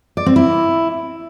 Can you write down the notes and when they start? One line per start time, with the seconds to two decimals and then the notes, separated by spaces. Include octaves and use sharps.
0.17 D5
0.26 C4
0.36 E4